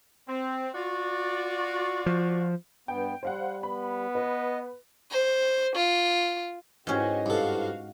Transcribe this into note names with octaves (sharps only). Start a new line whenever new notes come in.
C4
F4 F#4 D5
F3
G2 B3 G5
G3 C5 F5 F#5
B3 B5
B4 D#5
C5
F4
G#2 C#4 E4 F#4 G4 B4 C5 D#5
G2 F#4 A4 F5